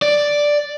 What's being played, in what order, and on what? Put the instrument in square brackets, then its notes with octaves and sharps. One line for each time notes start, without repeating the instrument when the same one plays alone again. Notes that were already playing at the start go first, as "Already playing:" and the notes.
[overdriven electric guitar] D5